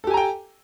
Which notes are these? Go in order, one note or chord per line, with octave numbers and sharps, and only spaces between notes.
G4 A4 G5 G#5 A#5